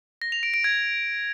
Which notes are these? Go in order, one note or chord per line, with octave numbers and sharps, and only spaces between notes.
A#6
F7
D7
D7
G#6